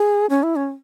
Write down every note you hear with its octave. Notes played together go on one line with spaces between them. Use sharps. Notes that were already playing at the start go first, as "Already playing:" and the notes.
Already playing: G#4
C#4
E4
C#4